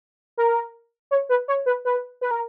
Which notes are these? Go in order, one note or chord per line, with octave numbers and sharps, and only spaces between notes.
A#4
C#5
B4
C#5
B4
B4
B4
A#4